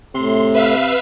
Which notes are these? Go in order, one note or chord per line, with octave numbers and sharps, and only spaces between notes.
A2 C3 C6
B4 E5 F5